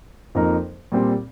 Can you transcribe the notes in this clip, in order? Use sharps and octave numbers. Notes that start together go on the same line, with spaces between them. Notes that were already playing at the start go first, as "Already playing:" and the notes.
F2 F3 A#3 D#4 A#4
A#2 G3 C4